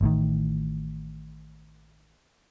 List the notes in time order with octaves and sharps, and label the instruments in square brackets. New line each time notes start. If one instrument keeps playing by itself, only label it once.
[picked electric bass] A1 A2 D#3